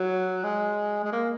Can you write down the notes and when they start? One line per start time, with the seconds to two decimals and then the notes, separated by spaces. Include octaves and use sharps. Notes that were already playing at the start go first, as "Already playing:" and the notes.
Already playing: F#3
0.43 G#3
1.04 G#3
1.12 A#3